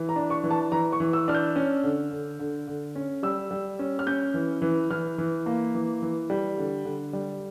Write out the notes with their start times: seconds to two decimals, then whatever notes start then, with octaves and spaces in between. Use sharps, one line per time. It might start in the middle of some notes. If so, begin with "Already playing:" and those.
Already playing: E3
0.09 A#5
0.16 D4
0.30 C#6
0.44 E3
0.51 A5
0.72 E3 A#5
0.92 C#6
1.00 E3
1.13 E6
1.28 D4 F6
1.34 G6
1.56 C#4
1.83 D3
2.11 D3
2.39 D3
2.67 D3
2.95 C#4
3.23 G3 E6
3.51 G3
3.79 C#4
3.99 F6
4.07 C#4 G6
4.34 E3
4.62 E3
4.90 E3 F6
5.18 E3
5.46 A#3
5.75 E3
6.02 E3
6.30 G3
6.58 D3
6.85 D3
7.13 G3